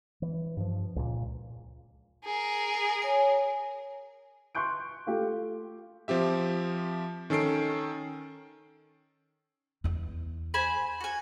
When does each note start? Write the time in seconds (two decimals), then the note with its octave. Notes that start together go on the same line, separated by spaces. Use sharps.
0.22 E3
0.57 G2 F3
0.96 C#2 A#2
2.25 G#4 A#4
3.02 C#5 G#5
4.55 C6 C#6 F#6 G6 D7
5.07 A3 F4 G4 A4 F5
6.08 F3 C4 G4 E5
7.30 D#3 C#4 A4 C7 D7
9.84 E2 E4
10.54 C5 G#5 B5
11.01 F#4 G#5